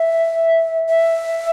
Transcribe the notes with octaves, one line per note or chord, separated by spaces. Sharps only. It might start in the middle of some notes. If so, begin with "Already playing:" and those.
Already playing: E5
E5